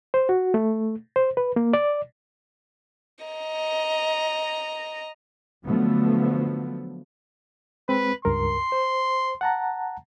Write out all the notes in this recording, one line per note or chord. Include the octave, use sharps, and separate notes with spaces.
C5
F#4
A3
C5
B4
A#3
D5
D#5 A#5
D3 F3 F#3 A3 B3
G#3 C4 B4
C#2 G2 A#4 C6
C5
F#5 A5 A#5